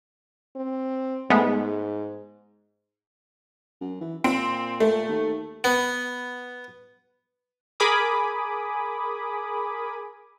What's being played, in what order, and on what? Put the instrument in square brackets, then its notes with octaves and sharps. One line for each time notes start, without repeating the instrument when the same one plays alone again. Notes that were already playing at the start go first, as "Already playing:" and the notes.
[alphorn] C4
[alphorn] G#2 [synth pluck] G#3 A3 B3
[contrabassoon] F#2
E3
[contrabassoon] A#2 [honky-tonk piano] C4
[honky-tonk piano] A3
[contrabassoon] D#2
[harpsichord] B3
[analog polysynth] G#4 A#4 G#5 B5 D6 D#6